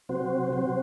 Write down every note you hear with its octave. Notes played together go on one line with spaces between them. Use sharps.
C3 F#3 C4 F#4 C5
C3 F#3 C4 F#4 C5